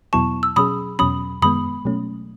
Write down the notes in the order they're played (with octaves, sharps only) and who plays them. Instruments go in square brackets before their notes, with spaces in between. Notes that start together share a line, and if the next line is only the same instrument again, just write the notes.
[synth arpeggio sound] E2 B2 F#3 B3 E4 [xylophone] A5 C#6
[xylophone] E6
[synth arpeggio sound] B2 F#3 C#4 G#4 [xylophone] B5 D#6
[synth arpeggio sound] E2 B2 F#3 C#4 [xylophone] B5 D#6
[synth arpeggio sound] F#2 D#3 G#3 B3 [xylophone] B5 D#6
[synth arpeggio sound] B2 F#3 A3 C#4